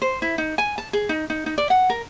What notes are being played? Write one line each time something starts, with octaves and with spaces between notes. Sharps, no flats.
C5
E4
D#4
G#5
A5
G#4
D#4
D#4
D#4
D5
F#5
A#4